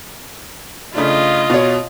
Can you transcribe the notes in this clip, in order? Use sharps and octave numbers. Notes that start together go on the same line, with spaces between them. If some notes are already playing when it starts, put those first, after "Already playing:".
C#3 A3 D4 F4 D#5
B2 C#5